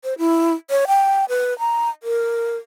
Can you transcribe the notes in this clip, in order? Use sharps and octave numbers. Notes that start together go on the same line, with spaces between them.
C5
E4
C#5
G5
B4
A#5
A#4